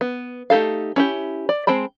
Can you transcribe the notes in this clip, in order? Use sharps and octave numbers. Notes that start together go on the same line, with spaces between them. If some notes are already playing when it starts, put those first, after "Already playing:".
B3
A3 D#4 G4 A4 F5
C#4 E4 G4
D5
G#3 C4 G5 A5 B5